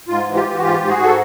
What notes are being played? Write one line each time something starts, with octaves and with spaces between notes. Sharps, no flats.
G#2 F4
E3
F4 G4
E3
F#4
G#2 F4 G4
G#2
F#4 G#4
G#2
A4